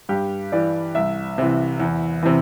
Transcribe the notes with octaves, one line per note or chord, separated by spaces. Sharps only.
G2 G4
E3 D5
C2 E5
C3 E3
E2
C3 E3